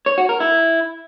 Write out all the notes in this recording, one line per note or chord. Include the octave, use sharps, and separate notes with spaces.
C#5
F#4
A#4
E4